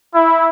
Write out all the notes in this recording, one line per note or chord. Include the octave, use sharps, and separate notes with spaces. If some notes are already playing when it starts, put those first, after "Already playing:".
E4